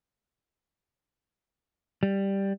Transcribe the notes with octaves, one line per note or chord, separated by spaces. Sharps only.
G3